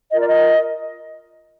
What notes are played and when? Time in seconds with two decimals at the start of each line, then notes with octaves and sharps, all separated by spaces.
0.12 F4 A#4 D#5
0.20 D5
0.28 D#5